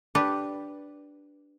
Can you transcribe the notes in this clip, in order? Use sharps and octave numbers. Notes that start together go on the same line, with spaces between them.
D4 G4 B4